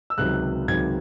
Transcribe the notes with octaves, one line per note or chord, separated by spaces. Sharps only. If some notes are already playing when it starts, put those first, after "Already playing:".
E6
C#2 C3 D#3 F#3 F#6
C#2 C3 D#3 F#3 G#6